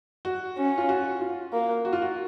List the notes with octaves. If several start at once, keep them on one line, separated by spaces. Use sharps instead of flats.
F#4
C#4
F4
F#4
F4
A#3
F#4
F4
F#4